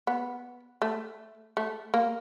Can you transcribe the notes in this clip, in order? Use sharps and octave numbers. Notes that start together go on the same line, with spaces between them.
B3
A3
A3
A#3